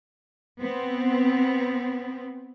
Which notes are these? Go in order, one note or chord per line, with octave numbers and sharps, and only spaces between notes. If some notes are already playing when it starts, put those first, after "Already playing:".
B3 C4